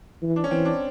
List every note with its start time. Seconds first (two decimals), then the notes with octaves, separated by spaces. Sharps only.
0.22 E3
0.36 D4
0.44 C#4
0.51 E3 C4
0.65 D4